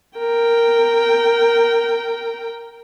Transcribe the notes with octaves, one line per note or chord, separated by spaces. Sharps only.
A#4 G5